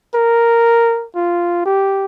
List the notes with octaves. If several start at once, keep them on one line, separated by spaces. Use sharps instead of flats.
A#4
F4
G4